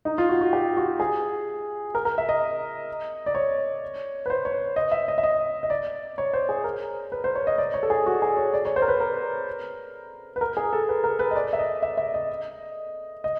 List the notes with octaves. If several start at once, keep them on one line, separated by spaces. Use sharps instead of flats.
D#4
F4
F#4
F#4
G4
F#4
G#4
A#4
A#4
E5
D#5
D5
C#5
B4
C5
C#5
D#5
E5
D#5
E5
D#5
D#5
D5
C#5
C5
G#4
A#4
B4
C5
C#5
D#5
D5
C#5
A4
G#4
F#4
G#4
C#5
D5
C#5
C5
A#4
B4
A#4
B4
A#4
G#4
A4
B4
A#4
B4
D#5
D5
E5
D#5
E5
E5
D#5
D#5